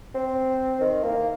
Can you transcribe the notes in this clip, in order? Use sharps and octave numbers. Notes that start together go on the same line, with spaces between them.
C4
D#3
A#3